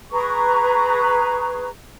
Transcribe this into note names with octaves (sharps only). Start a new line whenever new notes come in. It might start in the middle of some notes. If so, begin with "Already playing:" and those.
G#4 B4 A#5 C#6